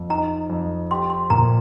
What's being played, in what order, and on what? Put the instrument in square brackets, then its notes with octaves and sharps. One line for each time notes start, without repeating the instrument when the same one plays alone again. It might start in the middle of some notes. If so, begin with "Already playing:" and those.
Already playing: [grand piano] F2
[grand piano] D#4 [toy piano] A#5
[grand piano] F2
[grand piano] G4 [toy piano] C6
[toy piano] C6
[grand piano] A#2 [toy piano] A#5